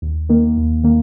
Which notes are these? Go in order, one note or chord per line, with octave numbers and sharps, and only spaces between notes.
D#2
D#3 A#3
D#2
D#3 A#3